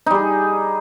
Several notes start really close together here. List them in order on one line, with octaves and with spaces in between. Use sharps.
D#4 G3 G#4